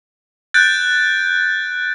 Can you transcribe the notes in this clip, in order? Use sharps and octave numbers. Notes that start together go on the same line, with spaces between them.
F#6 G6 A6 D7